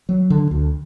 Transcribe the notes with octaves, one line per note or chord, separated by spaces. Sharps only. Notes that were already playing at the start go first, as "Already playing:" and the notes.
F#3
D3
D2